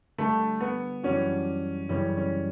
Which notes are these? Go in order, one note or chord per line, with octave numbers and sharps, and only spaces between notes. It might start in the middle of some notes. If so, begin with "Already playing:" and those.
D3 G3 A3 D4 A4
B3
F#2 E3 G3 C#4 D4 F#4
F#2 C#3 E3 G3 C#4
C#4